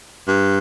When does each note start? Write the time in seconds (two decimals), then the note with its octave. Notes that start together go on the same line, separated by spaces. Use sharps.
0.28 G2